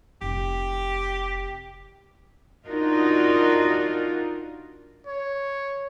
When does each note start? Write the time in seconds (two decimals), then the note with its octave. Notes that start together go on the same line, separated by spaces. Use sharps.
0.21 F1 G4
2.67 D4 D#4 F4 F#4 A#4 D#5
5.07 C#5